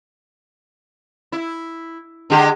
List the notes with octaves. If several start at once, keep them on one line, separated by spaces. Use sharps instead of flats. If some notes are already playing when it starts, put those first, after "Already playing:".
E4
D3 G#3 G4